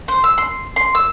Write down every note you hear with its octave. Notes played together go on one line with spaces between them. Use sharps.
C5
E6
C6
C6
E6